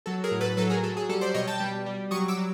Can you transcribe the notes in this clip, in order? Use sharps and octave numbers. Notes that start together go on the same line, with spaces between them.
F#3 A4
G#4 A#4
A2
A4 B4
F#3 A4 B4
G#4 A#4
F#3 A4
G#4
G3 A4
C5 D5
B2 C#5 D#5
G5 A5
G3
G3
F#3 C#6 D#6
D6 E6
F#3